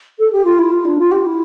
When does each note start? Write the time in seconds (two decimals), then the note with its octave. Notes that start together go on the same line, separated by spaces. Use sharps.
0.18 A4
0.32 G4
0.44 F4
0.58 E4
0.71 F4
0.84 D4
0.98 F4
1.11 G4
1.25 E4